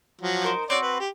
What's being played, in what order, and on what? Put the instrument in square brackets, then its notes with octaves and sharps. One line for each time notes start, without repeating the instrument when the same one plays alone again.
[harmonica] F3 F#3
[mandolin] D#4 A#4 C5
[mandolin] C4 F#4 [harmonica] C#5 D5
[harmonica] B4
G4